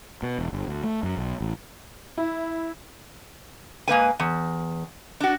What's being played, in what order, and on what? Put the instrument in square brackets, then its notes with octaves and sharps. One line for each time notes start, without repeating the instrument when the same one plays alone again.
[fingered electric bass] B2
E1
G1
D2
A3
F#2
B1
A1
[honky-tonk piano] E4
[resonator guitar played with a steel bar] G#2 A#3 B4 G#5
E2
D4 F#4